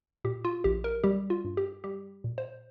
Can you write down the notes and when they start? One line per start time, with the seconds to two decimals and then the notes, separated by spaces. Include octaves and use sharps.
0.24 A#2 G4
0.45 F4
0.64 A#1 G4
0.84 A#4
1.04 G3 G4
1.30 F4
1.45 G2
1.57 G4
1.84 G3 G4
2.24 A#2
2.38 C5